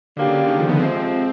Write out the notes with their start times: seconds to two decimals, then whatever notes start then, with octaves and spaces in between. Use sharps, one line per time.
0.17 D3 F#3 A#3 D4 G4
0.27 C#3
0.37 C#3
0.48 D#3
0.59 F3
0.69 B3
0.79 F2 C3 F3 G#3 C4